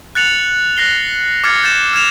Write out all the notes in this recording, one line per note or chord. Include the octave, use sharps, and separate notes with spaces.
F#6 A6 C#7 F7 F#7
F#6 A#6 C7 G7
D6 F6 G#6 A6 C#7
G6 A6 E7
F6 G#6 E7 F7